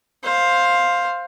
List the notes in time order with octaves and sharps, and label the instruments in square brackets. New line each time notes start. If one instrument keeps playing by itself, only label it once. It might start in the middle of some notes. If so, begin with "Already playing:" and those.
[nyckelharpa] C5 F5